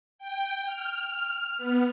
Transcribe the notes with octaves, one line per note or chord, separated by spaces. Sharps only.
G5
F6
B3